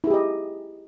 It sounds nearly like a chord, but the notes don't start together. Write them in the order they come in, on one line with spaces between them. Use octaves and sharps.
E4 G#4 G4 D#5